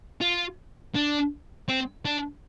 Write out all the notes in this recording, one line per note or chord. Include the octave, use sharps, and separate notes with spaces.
F4
D4
C4
D4